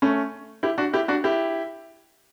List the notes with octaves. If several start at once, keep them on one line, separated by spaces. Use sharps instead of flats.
A3 C#4
E4 G4
D4 F#4
E4 G4
D4 F#4
E4 G4